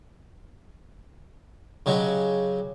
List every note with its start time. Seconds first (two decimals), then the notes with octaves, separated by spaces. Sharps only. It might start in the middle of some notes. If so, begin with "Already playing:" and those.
1.86 C#3 F#3 G#3 G4